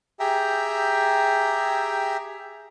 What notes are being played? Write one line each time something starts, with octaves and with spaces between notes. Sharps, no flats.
G4 G#4 E5 G5 A#5